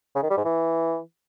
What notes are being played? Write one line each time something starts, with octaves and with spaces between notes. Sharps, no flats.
C#3
D#3
G3
G#2
E3